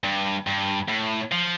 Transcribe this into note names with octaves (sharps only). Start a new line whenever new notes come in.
G2
G2
A2
F3